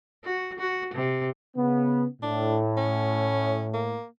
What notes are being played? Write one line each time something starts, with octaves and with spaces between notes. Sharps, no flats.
F#4
F#4
C3
C#3 B3
A2 D4
C#4
A#3